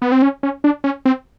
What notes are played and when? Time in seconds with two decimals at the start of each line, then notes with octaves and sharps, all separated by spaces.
0.02 B3
0.12 C4
0.22 C#4
0.43 C#4
0.64 D4
0.84 C#4
1.05 C4